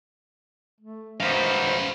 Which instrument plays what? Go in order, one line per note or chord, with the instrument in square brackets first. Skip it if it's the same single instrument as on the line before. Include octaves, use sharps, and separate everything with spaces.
[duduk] A3
[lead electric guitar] F#2 D#3 [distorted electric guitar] B4 F5 [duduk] C5